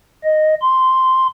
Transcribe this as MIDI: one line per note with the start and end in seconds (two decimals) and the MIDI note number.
0.24 0.55 75
0.62 1.27 84